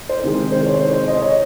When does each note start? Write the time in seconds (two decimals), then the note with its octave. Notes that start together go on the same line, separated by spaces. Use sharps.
0.09 C5
0.23 C3 D#3 G#3
0.52 C5
0.66 C#5
0.80 C5
0.94 C5
1.08 D#5
1.22 C#5